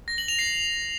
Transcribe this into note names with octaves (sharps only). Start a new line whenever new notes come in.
A#6
F#7
F7
C7